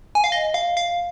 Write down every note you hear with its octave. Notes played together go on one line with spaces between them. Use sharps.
G#5
F5
D#5
F5
F5